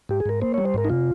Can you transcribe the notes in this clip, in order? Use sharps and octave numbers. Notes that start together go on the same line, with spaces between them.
G#2 G4
G#4
G#2 A#4
A#3 C5
G3 C#5
C5
G#2 A#4
D#4
C3 F4